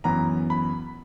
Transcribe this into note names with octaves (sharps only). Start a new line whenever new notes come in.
F#2 E3 B3 A#5
B5